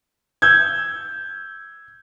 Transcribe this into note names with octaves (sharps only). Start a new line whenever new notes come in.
E6 G6 G#6